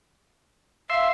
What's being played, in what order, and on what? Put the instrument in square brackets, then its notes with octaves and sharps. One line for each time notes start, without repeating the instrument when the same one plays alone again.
[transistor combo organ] E5 C6 [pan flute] F5